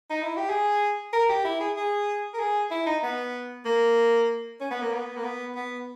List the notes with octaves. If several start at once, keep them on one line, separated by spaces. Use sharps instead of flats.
D#4
E4
G4
G#4
A#4
G4
E4
G#4
G#4
A#4
G#4
E4
D#4
B3
A#3
C#4
B3
A#3
B3
A#3
B3
B3